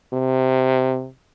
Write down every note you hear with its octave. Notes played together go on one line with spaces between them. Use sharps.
C3